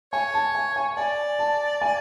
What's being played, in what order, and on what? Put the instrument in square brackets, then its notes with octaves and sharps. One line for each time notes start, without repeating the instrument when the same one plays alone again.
[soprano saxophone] C#5 [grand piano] G#5
[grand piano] A5
G#5
G#5
[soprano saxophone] D5 [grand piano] G#5
[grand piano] A5
G#5